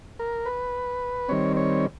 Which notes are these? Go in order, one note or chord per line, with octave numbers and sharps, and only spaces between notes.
A#4
B4
D#3 G3 C4 C#5
C#5